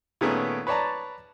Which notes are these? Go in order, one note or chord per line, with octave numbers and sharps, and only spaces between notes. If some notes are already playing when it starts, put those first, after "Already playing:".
A#2 D#3 A3 B3 C#4 G#4
B4 C#5 D5 A5 A#5